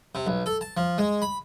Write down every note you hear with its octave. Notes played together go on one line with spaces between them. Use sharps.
C3
B1
A4
A5
F3
G#3
B5